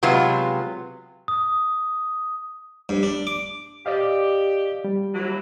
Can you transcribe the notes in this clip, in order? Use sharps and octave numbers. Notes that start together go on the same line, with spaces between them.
C3 F#3 G#3 B3 F4
D#6
G2
D4
D6
G4 D5 D#5 F5
G3
D#2 E3 F#3